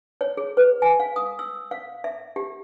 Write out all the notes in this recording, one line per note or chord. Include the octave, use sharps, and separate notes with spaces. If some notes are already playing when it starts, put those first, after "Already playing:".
C#5
G#4
B4
G#5
F5
D#6
E6
F5
E5
G4